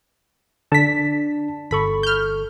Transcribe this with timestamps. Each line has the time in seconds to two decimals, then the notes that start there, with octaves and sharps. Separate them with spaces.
0.72 D3 D4 A5 B6
1.71 G1 A4 B5 C#6
2.03 F6 G6